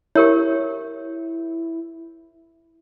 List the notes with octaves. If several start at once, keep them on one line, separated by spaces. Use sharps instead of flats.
E4 G4 A#4 C#5